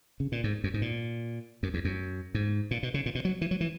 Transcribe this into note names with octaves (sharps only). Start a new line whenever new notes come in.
C#3
A#2
G#2
F#2
G#2
A#2
F#2
E2
F#2
G#2
A#2
B2
C#3
A#2
B2
F#3
E3
F#3
E3